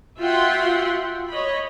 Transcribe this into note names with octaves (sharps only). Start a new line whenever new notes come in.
F4 F#4 E5 F#5 G5 C6
C#5 D#5 B5